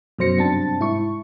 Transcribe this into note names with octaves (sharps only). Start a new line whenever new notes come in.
F#2 B2 F#3 C5 A#6 C#7
G2 C3 C4 D4 A5 A6
G#2 E4 C#6